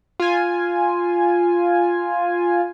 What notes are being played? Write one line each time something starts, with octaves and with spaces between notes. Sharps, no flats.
F4 G#5